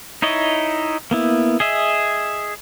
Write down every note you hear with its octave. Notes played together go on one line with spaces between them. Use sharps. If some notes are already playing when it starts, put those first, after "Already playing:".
D#4 E4 C#5 D#5
A#3 B3 E4
G#4 D#5 E5